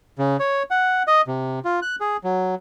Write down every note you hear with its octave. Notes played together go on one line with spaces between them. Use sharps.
C#3
C#5
F#5
D#5
C3
F4
F#6
G#4
F#3